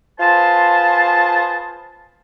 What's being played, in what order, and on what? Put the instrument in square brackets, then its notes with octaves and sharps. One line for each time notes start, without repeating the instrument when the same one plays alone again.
[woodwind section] F4 G#4 B4 C5 A5